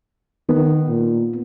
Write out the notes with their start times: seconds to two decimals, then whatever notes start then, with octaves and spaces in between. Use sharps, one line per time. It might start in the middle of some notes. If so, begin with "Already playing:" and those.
0.49 D#3 B3
0.89 A#2